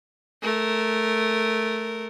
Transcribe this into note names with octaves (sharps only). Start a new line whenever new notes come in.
A3 A#4